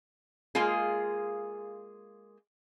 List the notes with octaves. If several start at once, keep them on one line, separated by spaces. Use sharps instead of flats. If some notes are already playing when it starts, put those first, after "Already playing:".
G#3 A#3 F4 G#4